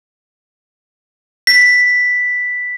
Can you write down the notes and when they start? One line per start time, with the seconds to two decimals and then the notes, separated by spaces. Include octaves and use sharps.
1.47 B6